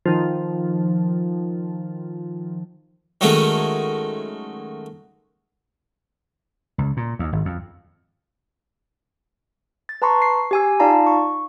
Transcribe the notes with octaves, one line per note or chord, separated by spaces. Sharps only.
D#3 F3
D#3 F#3 G#3 A3 C#4
C#2
A#2
D#2
G#1
F2
A6
B4 A5 A#5 C6 C#6
C7
G4 G#5 E6
D#4 F4 D5 F5 A5 A#5
C#6